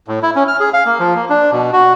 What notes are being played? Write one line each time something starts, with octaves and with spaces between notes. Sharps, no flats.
A2
E4
C#4
F6
G#4
F5
A#3
F3
A#3
D4
B2
F#4